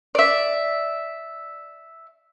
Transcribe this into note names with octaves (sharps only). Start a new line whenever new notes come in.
D5 E5